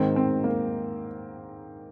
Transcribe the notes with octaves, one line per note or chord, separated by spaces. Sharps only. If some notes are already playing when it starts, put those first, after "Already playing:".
Already playing: G#2 D#3 C4
C4
A#3